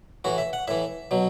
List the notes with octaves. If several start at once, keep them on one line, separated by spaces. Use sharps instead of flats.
A2 E3 F#4
E5
F#5
A2 E3 E5
B2 F#3